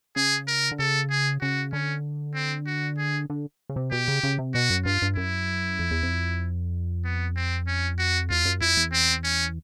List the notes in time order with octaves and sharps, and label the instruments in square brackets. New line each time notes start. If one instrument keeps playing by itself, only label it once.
[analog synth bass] C#3 [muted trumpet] G#4
[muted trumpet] A#4
[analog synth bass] D3
[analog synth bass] C#3 [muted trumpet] A4
[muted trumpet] G#4
[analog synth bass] C#3 [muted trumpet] F#4
[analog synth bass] D3 [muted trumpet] C#4
[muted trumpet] C4
F#4
G#4
[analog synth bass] D3
C#3
C3
[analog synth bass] B2 [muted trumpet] G4
[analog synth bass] C#3
C#3
C3
[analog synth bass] B2 [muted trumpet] F#4
[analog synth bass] F#2
[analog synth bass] G2 [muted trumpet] F4
[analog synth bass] G2
[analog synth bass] F#2 [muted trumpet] E4
[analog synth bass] F2
E2
F2
[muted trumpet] B3
C4
C#4
F#4
[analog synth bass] E2 [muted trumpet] F4
[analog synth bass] F#2
[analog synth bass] F2 [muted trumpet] E4
[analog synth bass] E2
[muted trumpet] C4
C#4